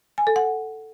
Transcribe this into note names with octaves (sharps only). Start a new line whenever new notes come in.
G#5
A4
F#5